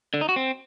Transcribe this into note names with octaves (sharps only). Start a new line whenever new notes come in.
D3
D#4
F#4
C4